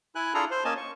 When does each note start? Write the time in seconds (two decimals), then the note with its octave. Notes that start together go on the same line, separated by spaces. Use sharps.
0.15 E4 G#5 F#6
0.34 D4 E4 F4 G#4 A4 A#5
0.51 C5
0.65 A#3 C#4 D#5 G#5 A5
0.77 C#6